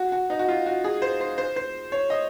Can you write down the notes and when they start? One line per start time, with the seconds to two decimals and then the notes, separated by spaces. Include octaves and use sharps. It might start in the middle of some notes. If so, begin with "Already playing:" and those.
Already playing: F#4
0.12 F#4
0.30 D#4
0.39 F#4
0.49 F4
0.66 F#4
0.84 G#4
1.02 C5
1.21 C5
1.38 C5
1.56 C5
1.92 C#5
2.10 D#5